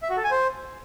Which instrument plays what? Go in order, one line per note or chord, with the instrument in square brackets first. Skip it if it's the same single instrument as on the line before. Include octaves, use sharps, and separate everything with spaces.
[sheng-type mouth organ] E5
F#4
A4
G#5
C5